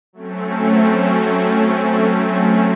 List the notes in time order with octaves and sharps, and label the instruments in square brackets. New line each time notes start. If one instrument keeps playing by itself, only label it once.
[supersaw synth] F#3 A3 C4 C#4